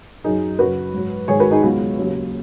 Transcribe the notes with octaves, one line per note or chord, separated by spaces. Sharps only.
F#2 F#3 D#4 G#4
F#2 C#3 F#3 F#4 B4
G#2 F#3
G#2 D#3 G#3 G#4 C#5
F#4 B4
D#4 G#4
C#2 B2 F#3 F#4
D#2 C#3 F#3